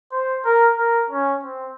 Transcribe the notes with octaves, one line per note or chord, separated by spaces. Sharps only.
C5
A#4
A#4
C#4
C4